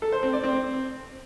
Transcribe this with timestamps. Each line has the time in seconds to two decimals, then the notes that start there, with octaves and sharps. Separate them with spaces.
0.02 A4
0.12 C5
0.23 C4
0.33 D5
0.44 C4